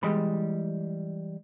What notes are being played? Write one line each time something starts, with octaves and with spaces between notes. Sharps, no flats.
E3 G3 G#3 B5